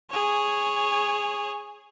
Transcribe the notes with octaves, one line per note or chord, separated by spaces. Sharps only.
G#4 C#5